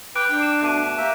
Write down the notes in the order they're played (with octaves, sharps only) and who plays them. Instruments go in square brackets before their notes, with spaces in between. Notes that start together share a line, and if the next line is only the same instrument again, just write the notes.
[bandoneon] B4 G5 [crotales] D6 F#6 D7
[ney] D4 [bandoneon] G5
[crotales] D7 E7
[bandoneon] B2 A3 [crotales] F#6 D#7
[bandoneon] A#3 G4 E5